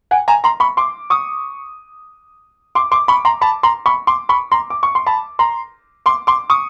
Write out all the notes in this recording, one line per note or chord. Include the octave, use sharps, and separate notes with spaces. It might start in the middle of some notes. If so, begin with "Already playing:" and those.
F#5 G#5
G#5 A#5
A#5 C6
B5 C#6
C6 D6
C#6 D#6
C6 D6
C6 D6
B5 C#6
A#5 C6
A5 B5
A#5 C6
B5 C#6
C6 D6
B5 C#6
A#5 C6
D6
C#6
C6
A5 B5
A#5 C6
C6 D6
C6 D6
C#6 D#6